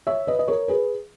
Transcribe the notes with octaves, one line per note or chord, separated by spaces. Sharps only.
C#5 E5
B4 D#5
D#5
A#4 C#5
G#4 B4